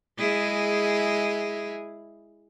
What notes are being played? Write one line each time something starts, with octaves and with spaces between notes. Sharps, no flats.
G#3 E4 G#4